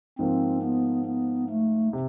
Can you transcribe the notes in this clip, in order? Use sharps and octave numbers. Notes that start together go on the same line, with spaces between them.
G#2 F3 A#3 C4
B3
B3
A3
C3